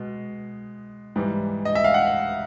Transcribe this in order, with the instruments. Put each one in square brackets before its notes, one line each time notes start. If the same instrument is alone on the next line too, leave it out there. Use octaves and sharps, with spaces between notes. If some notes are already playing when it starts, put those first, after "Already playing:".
Already playing: [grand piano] B2 G#3
G#2 E3 G3
D#5
E5
F5
F#5